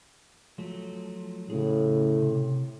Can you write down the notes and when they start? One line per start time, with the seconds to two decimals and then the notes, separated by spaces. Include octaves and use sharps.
0.58 F3 F#3 A3
1.50 A2 C#3 C#4 G#4
2.20 C3